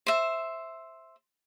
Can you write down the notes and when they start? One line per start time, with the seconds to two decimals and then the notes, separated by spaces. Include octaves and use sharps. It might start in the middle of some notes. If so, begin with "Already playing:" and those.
0.06 C5 E5